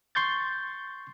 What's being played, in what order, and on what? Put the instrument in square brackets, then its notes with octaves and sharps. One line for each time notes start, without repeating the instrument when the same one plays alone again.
[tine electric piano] C6 C#6 G6 A6